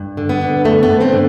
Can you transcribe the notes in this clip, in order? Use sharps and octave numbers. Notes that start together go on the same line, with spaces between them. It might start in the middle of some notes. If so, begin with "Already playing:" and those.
Already playing: G2
D3
B3
D3
G2 A3
B3
G2
A3 C4
D3